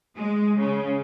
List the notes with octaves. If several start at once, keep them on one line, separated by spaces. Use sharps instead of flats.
G#3
C#3